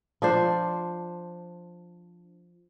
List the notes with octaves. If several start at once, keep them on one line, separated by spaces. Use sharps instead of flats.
F3 D4 C5